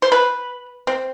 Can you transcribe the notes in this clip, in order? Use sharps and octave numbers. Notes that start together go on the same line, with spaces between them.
C5
B4
C4